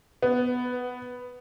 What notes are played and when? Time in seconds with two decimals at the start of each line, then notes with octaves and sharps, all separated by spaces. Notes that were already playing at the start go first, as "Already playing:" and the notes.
0.23 B3